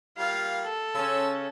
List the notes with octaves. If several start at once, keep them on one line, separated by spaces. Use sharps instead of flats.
G3 A#3 F4 F5
A4
C#3 C#4 A5 C6 E6